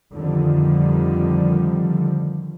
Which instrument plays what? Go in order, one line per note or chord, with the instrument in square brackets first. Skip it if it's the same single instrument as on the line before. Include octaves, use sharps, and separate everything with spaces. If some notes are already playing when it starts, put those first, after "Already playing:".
[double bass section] F2 D3 D#3 F3 G3